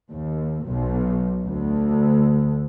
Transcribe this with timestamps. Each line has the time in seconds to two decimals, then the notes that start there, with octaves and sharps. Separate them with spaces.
0.11 D#2
0.66 B1
1.45 D2